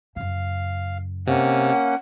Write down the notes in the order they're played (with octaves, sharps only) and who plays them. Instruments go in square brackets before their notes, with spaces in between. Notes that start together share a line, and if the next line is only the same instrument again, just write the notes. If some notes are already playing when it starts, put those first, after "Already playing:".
[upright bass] F#2 C#3 [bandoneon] F5
[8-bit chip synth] C3 [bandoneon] A#3 C#4 [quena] F#5